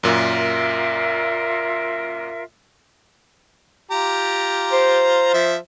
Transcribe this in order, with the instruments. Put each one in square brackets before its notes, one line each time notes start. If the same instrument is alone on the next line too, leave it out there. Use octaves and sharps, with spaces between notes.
[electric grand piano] F#2 A#2 [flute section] F4 A#4 E5
[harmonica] F4 G4 A#5
[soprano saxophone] C5
[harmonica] F3 E5